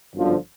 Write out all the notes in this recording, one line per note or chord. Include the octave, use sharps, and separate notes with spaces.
G1 F#2 D3 F3